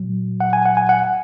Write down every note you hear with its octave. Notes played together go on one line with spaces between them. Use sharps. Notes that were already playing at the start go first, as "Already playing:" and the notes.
Already playing: A#2 F#3
F#5
G#5
F#5
G#5
F#5